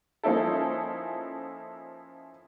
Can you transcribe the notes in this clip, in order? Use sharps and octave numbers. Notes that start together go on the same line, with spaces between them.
F3 A#3 C#4 D#4 E4 A4